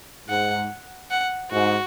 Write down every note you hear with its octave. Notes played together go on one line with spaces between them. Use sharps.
G#2 F#5
F#5
G#2 F#4